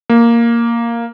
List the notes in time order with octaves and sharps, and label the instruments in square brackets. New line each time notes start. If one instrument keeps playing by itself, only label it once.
[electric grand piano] A#3